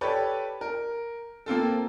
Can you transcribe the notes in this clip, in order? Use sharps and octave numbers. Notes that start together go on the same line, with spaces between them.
G4 A4 B4 C#5 D5
A#4
A#3 C4 F4 A4